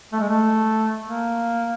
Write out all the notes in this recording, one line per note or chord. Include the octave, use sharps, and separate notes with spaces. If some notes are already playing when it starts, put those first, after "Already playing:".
A3
G#3
A3
A#3